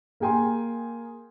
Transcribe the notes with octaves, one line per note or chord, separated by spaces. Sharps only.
A#3 G#4 G5 G#5 C6